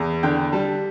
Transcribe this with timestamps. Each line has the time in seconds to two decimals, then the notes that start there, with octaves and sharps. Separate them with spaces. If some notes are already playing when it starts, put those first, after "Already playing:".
Already playing: E2
0.23 D3 G5
0.52 G3 A5